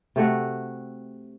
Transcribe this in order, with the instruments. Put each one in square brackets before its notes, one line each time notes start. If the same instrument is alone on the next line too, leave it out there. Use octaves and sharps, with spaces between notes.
[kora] C3 A3 F#4